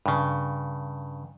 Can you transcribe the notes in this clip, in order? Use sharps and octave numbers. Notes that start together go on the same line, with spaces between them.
G2 C#3